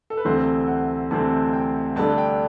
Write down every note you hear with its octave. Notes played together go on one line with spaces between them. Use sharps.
A4
B4
D2 C3 E3 A3 C4 C5
F#5
D2 C3 E3 A3 C4 A5
G5
G2 D3 A3 D4 A5
G5